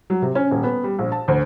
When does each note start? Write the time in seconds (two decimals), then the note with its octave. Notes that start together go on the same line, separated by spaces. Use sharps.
0.10 F#3
0.22 C3
0.35 C#4
0.51 D#1
0.63 B3
0.84 G3
0.99 A#1
1.12 A5
1.28 D2